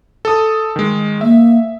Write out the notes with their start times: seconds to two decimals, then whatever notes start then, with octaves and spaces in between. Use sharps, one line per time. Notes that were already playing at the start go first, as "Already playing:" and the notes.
0.25 A4 D#6
0.76 D#3 G#3
1.21 A#3 E5